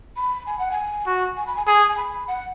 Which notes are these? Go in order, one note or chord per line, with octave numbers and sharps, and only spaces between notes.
B5
G#5
F#5
G#5
F#4
G#5
B5
G#5
G#4 G#5
G#5
B5
F#5